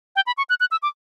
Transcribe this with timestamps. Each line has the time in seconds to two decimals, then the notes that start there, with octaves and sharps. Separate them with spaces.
0.16 G5
0.27 B5
0.38 C#6
0.49 F#6
0.60 F#6
0.71 E6
0.83 D6